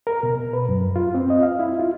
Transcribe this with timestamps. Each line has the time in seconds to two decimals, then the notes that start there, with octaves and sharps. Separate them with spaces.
0.07 A#4
0.23 B2
0.53 B4
0.69 F#2
0.96 F4
1.15 C4
1.30 D#5
1.43 F5
1.59 E4
1.79 F4